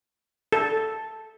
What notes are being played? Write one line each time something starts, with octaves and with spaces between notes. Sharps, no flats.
A4